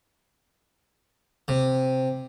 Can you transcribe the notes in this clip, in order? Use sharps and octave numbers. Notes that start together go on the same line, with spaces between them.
C3